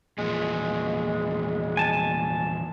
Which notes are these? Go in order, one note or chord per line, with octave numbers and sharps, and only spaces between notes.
E2 A#2 F3 G#3
G#5 A5